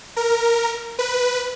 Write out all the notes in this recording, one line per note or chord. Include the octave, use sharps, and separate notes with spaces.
A#4
B4